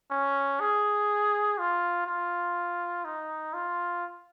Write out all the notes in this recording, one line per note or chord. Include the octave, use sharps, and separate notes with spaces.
C#4
G#4
F4
F4
D#4
F4